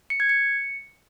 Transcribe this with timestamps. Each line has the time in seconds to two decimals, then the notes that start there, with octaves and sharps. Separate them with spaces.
0.10 C#7
0.20 G#6
0.29 C#7